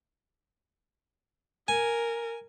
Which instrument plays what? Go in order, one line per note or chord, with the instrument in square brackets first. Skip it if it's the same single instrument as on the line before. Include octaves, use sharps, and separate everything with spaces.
[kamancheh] A#4 [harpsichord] G#5